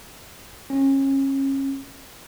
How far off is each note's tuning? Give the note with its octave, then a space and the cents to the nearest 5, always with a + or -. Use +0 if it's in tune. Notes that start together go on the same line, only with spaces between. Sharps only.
C#4 -30